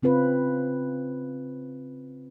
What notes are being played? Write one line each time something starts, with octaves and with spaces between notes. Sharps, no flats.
C#3 C4 F4 B4